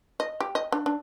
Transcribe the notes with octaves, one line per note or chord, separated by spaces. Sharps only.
D#5
G4
D#5
D4
D4